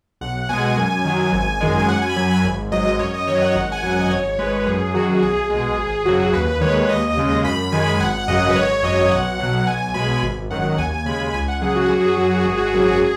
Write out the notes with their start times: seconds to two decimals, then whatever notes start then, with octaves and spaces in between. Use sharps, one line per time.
0.21 B1 F#5
0.49 B2 G#3 G#5
0.77 F#2
1.05 D#3 F#3
1.33 G#1
1.60 F#2 D#3 G#3
1.79 G#5
1.88 F#2 F#5
2.02 G#5
2.09 B5
2.16 F#3 G#5
2.30 B5
2.44 G#1
2.72 G#2 F#3 D#5
2.99 F#2 C#5
3.14 D#5
3.27 D#3 F#3 C#5
3.42 F#5
3.55 G#1 F#5
3.72 G#5
3.83 F#2 F#3 F#5
4.00 D#5
4.10 G#1 C#5
4.39 G#2 G#3 B4
4.66 F#2 G#4
4.94 D#3 F#3 F#4
5.22 B1 G#4
5.50 B2 G#3
5.78 G#1
6.05 F#2 C#3 F#3 F#4
6.20 G#4
6.33 D#2 B4
6.61 D#3 G#3 C#5
6.89 D#2 D#5
7.17 C#3 G#3
7.44 F#2 B5
7.72 D#3 G#3 G#5
8.00 G#1 F#5
8.23 F#5
8.28 F#2 C#3 F#3 D#5
8.50 B4
8.56 G#1 C#5
8.83 F#2 F#3 D#5
9.11 B1 F#5
9.39 B2 F#3 F#5
9.67 B1 G#5
9.94 B2 G#3 B5
10.22 G#1
10.50 F#2 D#3 F#3 F#5
10.77 D#2 G#5
11.06 C#3 G#3 B5
11.34 C#2 G#5
11.48 F#5
11.62 C#3 F#3 G#4
11.76 F#4
11.84 G#4
11.90 F#2 F#4
12.00 G#4
12.08 F#4
12.16 F#3 G#4
12.24 F#4
12.33 G#4
12.41 F#4
12.45 G#1 G#4
12.57 F#4
12.66 G#4
12.73 F#2 F#3 F#4
12.82 G#4
12.90 F#4
13.01 G#4